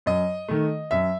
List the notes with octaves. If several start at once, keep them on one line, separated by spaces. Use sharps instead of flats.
F#2 D#5
D#3 A3
F#2 E5